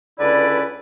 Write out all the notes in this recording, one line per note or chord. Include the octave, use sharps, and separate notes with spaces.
C#2 D3 C#4 E4 B4 D5